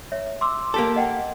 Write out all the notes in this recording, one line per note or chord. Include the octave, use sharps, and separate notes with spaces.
C#5 E5
C6 D6 E6
A#3 G4 A4
D#5 F#5 G5